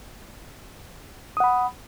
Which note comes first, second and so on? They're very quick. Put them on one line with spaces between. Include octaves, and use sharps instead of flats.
D#6 F#5 B5